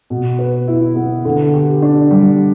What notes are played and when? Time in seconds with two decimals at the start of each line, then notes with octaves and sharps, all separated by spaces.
0.10 B2
0.39 B4
0.67 E4
0.96 B3
1.25 D3
1.54 G4
1.82 D4
2.11 G3